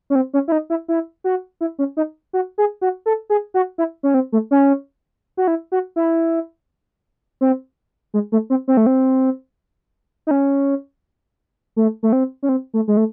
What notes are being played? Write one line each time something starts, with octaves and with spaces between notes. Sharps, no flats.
C#4
C4
C#4
E4
D#4
E4
E4
F#4
E4
C#4
D#4
F#4
G#4
F#4
A4
G#4
F#4
E4
C#4
C4
A3
C#4
F#4
E4
F#4
E4
C4
G#3
A3
C4
C4
A3
C4
D#4
C#4
A3
A3
C4
C#4
C4
A3
G#3
A3